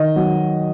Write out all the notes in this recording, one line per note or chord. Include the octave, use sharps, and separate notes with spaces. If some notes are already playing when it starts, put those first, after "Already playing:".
Already playing: D#3 D#5
F#3